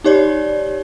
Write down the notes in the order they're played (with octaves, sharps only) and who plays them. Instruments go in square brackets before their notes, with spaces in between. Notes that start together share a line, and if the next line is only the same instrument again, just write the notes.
[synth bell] D#4 G4 C#5 D5